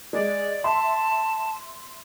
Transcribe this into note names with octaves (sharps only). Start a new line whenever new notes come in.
G#3 D5
E5 A5 C6